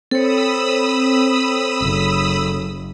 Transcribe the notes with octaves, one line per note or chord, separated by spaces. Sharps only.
C4 A4 C#5 B5 D#6 E6
F#1